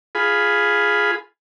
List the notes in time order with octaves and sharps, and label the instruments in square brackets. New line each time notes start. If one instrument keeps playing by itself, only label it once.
[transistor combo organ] F4 G#4 B5